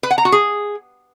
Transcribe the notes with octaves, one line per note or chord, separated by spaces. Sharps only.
B4
F#5
A#5
F#4
G#4